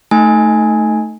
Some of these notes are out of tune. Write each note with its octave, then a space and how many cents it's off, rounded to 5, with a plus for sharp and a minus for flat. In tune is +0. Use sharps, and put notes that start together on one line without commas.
A3 +0 D#4 +0 G#5 +0